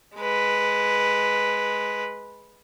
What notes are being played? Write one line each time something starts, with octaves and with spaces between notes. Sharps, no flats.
G#3 B4